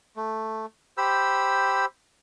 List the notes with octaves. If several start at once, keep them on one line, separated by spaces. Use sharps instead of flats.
A3
G4 C5 B5 E6